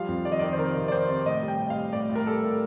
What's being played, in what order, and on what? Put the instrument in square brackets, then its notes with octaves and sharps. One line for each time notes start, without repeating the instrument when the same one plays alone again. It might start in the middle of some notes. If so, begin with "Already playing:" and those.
Already playing: [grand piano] F3 G3 F5
F2
D#3 D5
D#5
D#3 D5
C5
C3 A#4
C3
D5
D#3 C5
C3
A2 D#5
G3
G5
A2
F5
G3
A2 D5
A2
A#4
G3 A4
A2